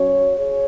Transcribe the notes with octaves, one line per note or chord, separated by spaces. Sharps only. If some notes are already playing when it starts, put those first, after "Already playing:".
Already playing: F#3 C#4 F#4 C#5
G#4 C#5